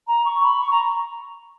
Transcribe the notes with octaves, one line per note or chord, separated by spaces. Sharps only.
A#5
C#6
B5
C#6
A#5